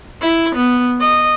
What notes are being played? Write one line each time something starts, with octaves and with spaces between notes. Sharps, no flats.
E4
B3
D#5